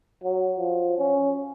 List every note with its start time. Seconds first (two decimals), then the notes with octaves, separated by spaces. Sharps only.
0.24 F#3
0.58 F3
0.98 C#4